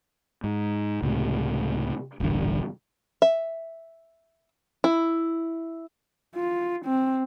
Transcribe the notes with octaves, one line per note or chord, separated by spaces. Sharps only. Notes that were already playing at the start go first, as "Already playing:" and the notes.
G#2
C#2 A2 C3
D#1 A1 G2 D3
E5
E4
F4
C4